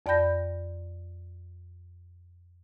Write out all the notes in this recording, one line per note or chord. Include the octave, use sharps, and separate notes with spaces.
F2 D5 G5 B5 G6 A#6